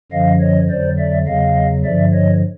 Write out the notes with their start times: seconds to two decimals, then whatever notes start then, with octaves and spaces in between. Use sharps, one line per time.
0.12 F#2 D3 F3 D#5 F5
0.41 C#5 D#5
0.70 F2 D3 F#3 C5 D5
0.98 D5 E5
1.27 E2 C#3 F#3 D#5 F5
1.85 G2 D3 F3 D5 E5
2.13 C#5 D#5